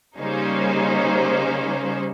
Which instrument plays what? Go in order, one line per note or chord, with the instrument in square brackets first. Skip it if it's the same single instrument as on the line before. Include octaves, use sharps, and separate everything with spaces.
[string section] C#3 G3 A#3 C#4 D#4 C5